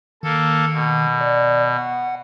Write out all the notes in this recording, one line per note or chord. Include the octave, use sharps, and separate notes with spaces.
D#3 A#3 A4
B2
D5
F#5